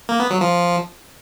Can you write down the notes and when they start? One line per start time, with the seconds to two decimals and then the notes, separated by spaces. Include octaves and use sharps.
0.09 A#3
0.20 B3
0.30 F#3
0.41 F3